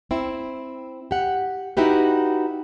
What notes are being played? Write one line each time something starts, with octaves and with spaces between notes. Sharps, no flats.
C4 E4
G4 F#5
D#4 E4 F#4 G4 B4